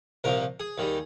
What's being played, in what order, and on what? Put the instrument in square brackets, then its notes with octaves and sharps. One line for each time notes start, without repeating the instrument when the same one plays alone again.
[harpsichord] C2 A#2 F3 A#4
G#4
D#2 D#3 G3